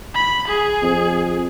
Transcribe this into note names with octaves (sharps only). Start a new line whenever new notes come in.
B5
G#4
F2